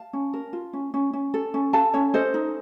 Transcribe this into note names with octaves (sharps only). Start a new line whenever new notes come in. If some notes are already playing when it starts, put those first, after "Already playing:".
Already playing: F5 A5
C#4
A#4
F4
C#4
C#4
C#4
A4
C#4
A4 F5 A5
C#4 C#5
A4 C5 D#5
D#4